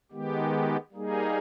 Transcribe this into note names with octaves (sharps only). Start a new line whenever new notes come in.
D#3 G#3 B3 G4
G3 A#3 D#4 G#4